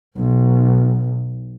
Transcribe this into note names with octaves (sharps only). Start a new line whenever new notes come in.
B1